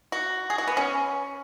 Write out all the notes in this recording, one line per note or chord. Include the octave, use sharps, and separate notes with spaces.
F#4
G#4
F#4
B3
C#4